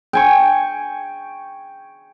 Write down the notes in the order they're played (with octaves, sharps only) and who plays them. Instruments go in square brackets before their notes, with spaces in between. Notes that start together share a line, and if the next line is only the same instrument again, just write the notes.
[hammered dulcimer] G5 G#5 C#6